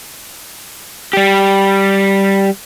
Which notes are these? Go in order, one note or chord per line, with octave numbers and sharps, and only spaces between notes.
G3 G4